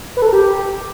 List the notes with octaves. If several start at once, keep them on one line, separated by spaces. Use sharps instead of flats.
B4
A4
A#4
G4